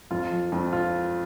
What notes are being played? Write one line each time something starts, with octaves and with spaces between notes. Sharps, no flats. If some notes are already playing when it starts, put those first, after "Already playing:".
F2 F4
F3
F2
F4